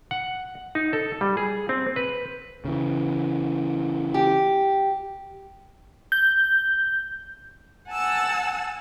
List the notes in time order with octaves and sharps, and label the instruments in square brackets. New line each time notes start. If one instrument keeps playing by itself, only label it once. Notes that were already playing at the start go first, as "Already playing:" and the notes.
[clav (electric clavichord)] F#5
D#4
A4
G3
G#4
C4
B4
[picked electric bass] C#3 E3
[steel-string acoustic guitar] G4
[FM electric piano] G6
[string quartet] F#5 G#5 A5 E6 A6